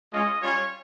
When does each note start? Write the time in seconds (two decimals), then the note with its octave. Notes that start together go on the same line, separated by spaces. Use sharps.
0.13 G#3 C#4 F4 D#5
0.42 G3 C#4 F4 C#5